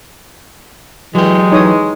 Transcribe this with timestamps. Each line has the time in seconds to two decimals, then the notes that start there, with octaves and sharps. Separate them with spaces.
1.15 E3 F#3 G#3 G4
1.52 E3 D#4 C#5 D#6